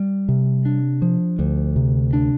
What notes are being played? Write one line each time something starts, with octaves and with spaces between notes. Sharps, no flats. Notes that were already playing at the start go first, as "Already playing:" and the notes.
Already playing: G3
C3
D4
F3
D2
C3
D4